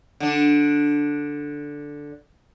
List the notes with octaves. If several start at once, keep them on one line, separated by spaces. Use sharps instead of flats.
D3 D4